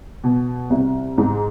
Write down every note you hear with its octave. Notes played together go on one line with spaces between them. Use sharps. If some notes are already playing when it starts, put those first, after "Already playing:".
B2
C2
G#2